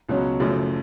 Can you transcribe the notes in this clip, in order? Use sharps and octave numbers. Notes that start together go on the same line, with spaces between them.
C#2 B2 F#3 C#4
F#1 F#2 F3 A3